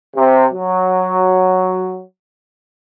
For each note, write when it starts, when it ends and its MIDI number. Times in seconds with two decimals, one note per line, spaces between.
0.15 0.45 48
0.52 2.02 54